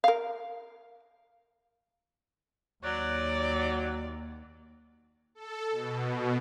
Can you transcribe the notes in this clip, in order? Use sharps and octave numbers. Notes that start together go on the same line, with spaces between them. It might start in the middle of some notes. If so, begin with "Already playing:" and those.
A#4 F5
D#2 F#3 D5
A4
B2